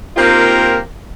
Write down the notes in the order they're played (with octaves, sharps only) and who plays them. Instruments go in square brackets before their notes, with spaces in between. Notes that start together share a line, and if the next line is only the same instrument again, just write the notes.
[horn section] A#3 C4 D#4 F4 G4 A#4